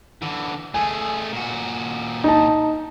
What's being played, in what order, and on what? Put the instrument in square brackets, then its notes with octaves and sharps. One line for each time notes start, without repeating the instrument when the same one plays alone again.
[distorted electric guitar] D3 E3
[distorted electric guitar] A3 G#4 [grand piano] G#5
[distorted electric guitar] A#2 F#4
[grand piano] D#4 A5